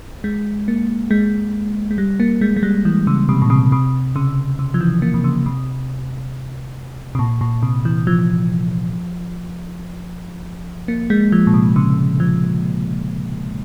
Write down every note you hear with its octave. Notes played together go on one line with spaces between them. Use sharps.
G#3
A#3
G#3
G#3
G3
A#3
G#3
G#3
G3
E3
C#3
C3
A#2
C3
C3
C#3
C#3
F3
E3
A#3
C3
C#3
C3
C3
A#2
A#2
C3
E3
F3
A#3
G#3
F3
A#2
C3
C#3
F3